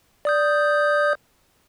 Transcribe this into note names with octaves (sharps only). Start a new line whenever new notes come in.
D5 D#6 G6